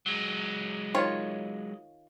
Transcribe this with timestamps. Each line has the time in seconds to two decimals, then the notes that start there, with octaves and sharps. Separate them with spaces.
0.06 F#3 G#3
0.95 D#3 F4 C#5